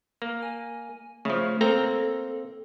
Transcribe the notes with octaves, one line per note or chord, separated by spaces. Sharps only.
A#3
G#5
C#3 F3 A3
A#3 C4 A4 A#5